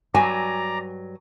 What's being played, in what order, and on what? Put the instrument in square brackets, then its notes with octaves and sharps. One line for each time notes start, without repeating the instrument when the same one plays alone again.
[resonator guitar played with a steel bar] G2 F#3 [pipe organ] D5 A#5 [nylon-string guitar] G#5